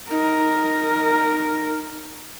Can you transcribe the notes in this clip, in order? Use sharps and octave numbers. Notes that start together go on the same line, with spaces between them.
D#4 A#4